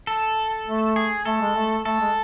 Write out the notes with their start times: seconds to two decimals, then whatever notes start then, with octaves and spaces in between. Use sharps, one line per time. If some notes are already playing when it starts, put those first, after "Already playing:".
0.07 A4
0.67 A3
0.96 G#4
1.25 A3 A4
1.41 G#3
1.56 A3
1.85 A3 A4
2.00 G#3